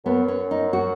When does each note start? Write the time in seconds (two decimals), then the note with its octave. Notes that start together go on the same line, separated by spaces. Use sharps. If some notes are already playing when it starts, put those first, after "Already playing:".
0.05 F#2 B3
0.28 C#4
0.51 D#4
0.73 F#4